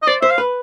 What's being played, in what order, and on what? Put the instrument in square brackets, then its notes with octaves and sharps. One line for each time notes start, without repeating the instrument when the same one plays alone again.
[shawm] D#5
[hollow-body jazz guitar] C5 [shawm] D5
[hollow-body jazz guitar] C5 [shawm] E5
[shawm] F5
[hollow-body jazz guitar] B4